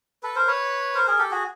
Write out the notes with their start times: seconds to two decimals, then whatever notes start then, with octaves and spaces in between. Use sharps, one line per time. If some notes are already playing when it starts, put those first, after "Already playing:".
0.23 A4 B4
0.36 A#4 C5
0.47 B4 C#5
0.95 A#4 C5
1.08 G#4 A#4
1.19 G4 A4
1.31 F#4 G#4